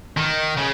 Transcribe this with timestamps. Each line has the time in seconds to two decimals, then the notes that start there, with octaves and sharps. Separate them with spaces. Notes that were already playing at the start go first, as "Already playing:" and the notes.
0.17 D#3
0.57 C#3